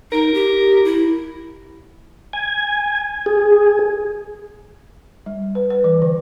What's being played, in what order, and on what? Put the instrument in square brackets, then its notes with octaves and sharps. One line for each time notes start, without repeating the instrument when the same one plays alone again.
[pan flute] D#4 [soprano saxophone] A#4
[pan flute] G4
E4
[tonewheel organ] G#5
G#4
[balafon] G3
B4
B4
E3
D3